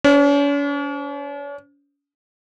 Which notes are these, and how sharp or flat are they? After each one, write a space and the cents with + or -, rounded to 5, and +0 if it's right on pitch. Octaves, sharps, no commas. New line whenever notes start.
C#4 +45 C5 +0